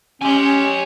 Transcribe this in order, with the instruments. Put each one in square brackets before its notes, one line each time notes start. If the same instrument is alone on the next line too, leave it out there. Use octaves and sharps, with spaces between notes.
[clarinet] C#4 [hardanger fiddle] G4 C#5 [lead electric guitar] G#5 C6